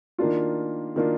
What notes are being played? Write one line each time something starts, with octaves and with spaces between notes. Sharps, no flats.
D#3 A#3 D4 F4
D#3 A#3 D4 F4